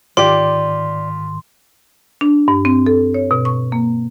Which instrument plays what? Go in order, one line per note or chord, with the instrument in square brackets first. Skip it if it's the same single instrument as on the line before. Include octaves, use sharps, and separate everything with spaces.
[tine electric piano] G#2 D#3 [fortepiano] F4 G4 [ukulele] D5 [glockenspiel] C6
[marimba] D4
G2
C4
A4
C#5
B2
C#6
A#3